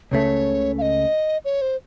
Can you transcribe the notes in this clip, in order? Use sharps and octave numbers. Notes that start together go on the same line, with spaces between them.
C#2 C#3 A3 C#5
F5
D#5
C#5
C5